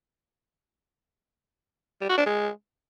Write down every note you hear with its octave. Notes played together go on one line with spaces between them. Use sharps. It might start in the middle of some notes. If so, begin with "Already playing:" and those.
G3
F#4
D4
G#3